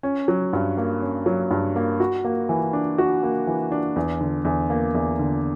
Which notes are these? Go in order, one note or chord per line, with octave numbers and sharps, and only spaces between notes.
C#4
F#3
G2
A#3
C#4
F#3
G2
A#3
F#4
A#3
E3
D4
F#4
A#3
E3
D4
E2
D3
E2
A#3
E2
D3